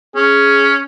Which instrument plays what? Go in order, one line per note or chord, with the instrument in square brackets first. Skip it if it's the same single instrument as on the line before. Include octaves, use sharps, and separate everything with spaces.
[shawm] C#4 [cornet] G#4